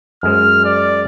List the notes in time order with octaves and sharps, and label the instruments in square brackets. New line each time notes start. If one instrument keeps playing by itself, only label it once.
[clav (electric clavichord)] F#2 G#3 C5 [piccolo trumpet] F6
[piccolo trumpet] D5